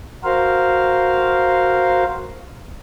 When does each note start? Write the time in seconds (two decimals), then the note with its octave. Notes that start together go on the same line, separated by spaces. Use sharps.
0.24 F#4 A#4 C5 F5